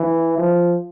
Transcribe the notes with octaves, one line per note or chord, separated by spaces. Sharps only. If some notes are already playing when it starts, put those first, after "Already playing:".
Already playing: E3
F3